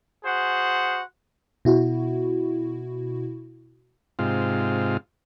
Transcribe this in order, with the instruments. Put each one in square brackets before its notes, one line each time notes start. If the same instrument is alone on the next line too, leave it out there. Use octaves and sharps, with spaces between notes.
[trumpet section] F#4 G#4 C5 F#5
[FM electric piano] B2 E4 F#4
[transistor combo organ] G#2 C3 F4